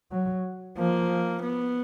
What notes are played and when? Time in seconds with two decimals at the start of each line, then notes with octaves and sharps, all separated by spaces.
0.12 F#3
0.78 F3 A#3
1.43 B3